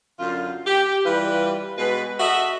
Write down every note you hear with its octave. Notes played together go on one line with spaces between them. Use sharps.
F#2 D3 F4
G4
E3 G3 F4 B4
B2 G#3 B4
F#4 A4 D#5 E5